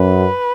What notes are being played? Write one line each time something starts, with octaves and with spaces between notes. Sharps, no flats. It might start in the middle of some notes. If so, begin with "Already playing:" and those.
Already playing: F#2 B4